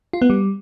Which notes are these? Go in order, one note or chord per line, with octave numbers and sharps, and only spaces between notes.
F4
B3
G3